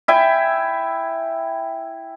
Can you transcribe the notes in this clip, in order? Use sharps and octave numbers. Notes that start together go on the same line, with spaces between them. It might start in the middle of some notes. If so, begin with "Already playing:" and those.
E4 E5 G5 G#5